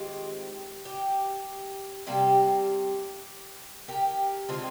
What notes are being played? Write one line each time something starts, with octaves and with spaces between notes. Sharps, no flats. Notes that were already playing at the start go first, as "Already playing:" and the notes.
Already playing: D#3 G#3 C4 F4 G4
G4
C3 G3 A#3 G4
G4 A#4
D3 G#3 C4 F4